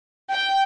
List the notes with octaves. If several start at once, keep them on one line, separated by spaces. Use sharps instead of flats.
G5